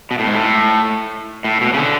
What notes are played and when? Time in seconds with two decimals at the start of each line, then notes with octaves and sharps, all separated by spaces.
0.11 B2
0.19 A2
0.27 G#2
0.35 A2
1.44 A2
1.61 B2
1.74 C#3
1.77 D3